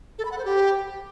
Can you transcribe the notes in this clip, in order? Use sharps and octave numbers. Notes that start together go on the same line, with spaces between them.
A4
B5
F#5
C5
G4